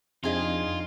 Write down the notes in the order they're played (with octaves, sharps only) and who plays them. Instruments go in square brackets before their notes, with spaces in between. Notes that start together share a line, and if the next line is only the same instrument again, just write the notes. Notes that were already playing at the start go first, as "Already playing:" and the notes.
[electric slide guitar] F2 [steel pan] C4 D4 [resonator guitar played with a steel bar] D#4 G#4 D#5 [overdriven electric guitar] F4